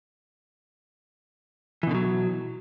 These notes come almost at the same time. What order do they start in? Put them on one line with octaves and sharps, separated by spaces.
E3 B2 D3 F#3